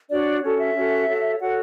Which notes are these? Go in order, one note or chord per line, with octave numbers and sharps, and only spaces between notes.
D4 F#4 C#5 D5
C#4 F#4 A4 C#5
E5
C#4 F#4 A4
F#4 A4 C#5
F#4 A4 C#5 F#5